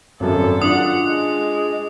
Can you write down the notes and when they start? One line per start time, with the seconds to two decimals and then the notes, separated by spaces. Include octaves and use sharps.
0.20 G#1 F#2 A4
0.62 D4 F4 F#5 D#6
1.06 G#3